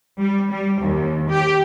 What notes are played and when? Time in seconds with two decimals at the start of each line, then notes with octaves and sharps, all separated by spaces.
0.20 G3
0.51 G3
0.81 D#2
1.30 G4